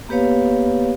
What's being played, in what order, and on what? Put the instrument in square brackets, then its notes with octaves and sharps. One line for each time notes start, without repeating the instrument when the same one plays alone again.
[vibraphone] A#3 B3 G4 B4 C#5 F5